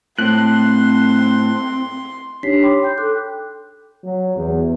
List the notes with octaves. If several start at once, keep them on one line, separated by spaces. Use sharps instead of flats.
A2 C4 C6 F#6
D4 D#4 G4 C#5 B6 C7
C#5 G5 B5 C6 D6
G5 G6
A4 G5 D6 F#6
F#3
E2